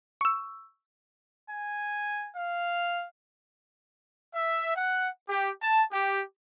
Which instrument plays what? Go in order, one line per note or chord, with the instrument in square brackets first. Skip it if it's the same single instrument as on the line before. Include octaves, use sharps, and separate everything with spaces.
[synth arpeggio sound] C#6 E6
[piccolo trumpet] G#5
F5
[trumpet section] E5
F#5
G4
A5
G4